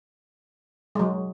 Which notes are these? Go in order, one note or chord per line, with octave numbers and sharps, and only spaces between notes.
G#3
F#3